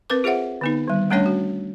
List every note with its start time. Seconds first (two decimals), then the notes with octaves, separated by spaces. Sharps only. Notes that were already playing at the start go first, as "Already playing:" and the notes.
0.10 C4 A#4 B4 D6
0.24 F4 G#4 C5 E5 F#5
0.61 D3 B3 D#4
0.88 D#3 G3
1.10 G3 A3 C#4 D4 C#5 G5
1.26 F#4